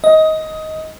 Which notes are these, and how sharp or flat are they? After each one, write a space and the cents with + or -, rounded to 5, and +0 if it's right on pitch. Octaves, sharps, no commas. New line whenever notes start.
D#5 +15